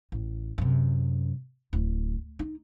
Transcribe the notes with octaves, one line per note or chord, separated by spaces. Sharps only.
A1
F#2 C3
D1
D#4